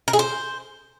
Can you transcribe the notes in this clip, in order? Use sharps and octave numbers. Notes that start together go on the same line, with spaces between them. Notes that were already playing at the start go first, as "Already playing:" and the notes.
A#4
G#4
C5